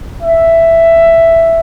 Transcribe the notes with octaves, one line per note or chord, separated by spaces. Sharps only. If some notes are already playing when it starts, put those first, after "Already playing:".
E5